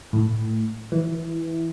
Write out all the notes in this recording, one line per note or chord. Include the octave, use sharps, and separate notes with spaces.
A2
E3